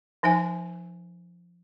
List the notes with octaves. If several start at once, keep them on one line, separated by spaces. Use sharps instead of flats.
F3 D#4 C5 E5 G#5